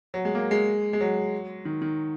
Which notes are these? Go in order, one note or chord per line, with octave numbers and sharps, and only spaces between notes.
F#3
G#3
A#3
G#3
G#3
F#3
D#3
D#3